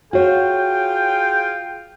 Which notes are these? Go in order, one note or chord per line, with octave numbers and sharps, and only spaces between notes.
F4 F#4 G#4 C#5 G5